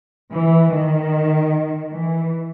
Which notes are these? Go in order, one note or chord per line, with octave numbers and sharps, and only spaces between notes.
E3
D#3
E3